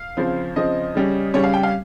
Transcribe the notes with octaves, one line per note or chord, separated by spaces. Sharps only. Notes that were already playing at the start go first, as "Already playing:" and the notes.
Already playing: F5
C#3 F3 C4
C#3 F3 C4 D#5
C#3 G3 C#4
C#3 G3 C#4 C#5
F5
G5
F5